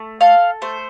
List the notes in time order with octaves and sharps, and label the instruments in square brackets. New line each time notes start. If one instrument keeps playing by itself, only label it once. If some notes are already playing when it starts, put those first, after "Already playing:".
Already playing: [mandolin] A3
A4 F5
A3 C5